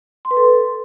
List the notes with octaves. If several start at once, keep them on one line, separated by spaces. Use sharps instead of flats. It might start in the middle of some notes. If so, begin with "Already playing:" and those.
C6
B4
A4